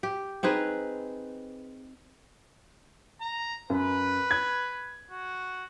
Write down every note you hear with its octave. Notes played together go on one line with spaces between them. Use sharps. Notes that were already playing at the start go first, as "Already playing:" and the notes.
G4
C4 D#4 G#4 B4
A#5
F#2 B4
G#6
F#4